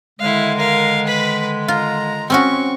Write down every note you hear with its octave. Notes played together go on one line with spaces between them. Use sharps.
D3 D#3 G#3 E4 F5
A#4 F5
B4 B5
F4 A#5
C4 C#4 F#4 C#6